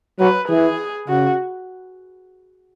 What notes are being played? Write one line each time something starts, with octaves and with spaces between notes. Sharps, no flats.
F#3 B4
E3 G#4
C#3 F#4